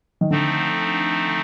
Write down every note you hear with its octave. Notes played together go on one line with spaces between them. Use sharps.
D#3
D3 F3 A3 C4 D#4